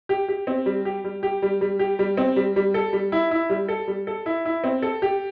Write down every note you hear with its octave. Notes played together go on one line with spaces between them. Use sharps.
G4
G4
C4
G3
G4
G3
G4
G3
G3
G4
G3
C4
G3
G3
A4
G3
E4
E4
G3
A4
G3
A4
E4
E4
C4
A4
G4